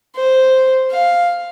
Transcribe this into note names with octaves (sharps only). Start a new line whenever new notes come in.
C5
F5